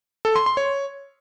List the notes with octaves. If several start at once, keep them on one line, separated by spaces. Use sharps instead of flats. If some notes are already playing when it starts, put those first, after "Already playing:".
A4
C6
C6
C#5